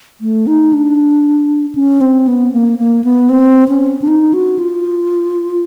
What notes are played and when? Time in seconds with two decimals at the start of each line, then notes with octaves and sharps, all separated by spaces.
0.21 A3
0.47 D#4
0.73 D4
1.75 C#4
2.01 C4
2.27 B3
2.53 A#3
2.78 A#3
3.04 B3
3.29 C4
3.68 C#4
4.02 D4
4.07 D#4
4.33 F#4
4.59 F4